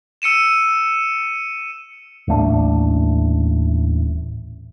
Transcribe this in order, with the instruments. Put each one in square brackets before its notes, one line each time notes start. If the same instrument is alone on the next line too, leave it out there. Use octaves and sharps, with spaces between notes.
[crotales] E6 C#7 D#7 E7
[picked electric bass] D#1 A1 A3 D4